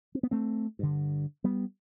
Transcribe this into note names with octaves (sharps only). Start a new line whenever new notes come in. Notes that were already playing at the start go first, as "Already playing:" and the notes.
C4
B3
A3 C4
G2 D3
G3 B3